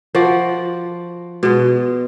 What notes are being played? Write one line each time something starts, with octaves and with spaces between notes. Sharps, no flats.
F3 F#4 D5 F#5
B2 G#3